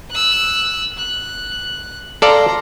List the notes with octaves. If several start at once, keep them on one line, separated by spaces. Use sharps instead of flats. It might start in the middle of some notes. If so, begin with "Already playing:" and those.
E6 F#6
F#6
A4 D5 F5 A#5 C6